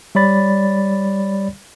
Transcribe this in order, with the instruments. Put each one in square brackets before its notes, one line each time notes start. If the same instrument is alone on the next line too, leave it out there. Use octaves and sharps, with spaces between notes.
[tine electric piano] G3 C#5 D5 B5 A6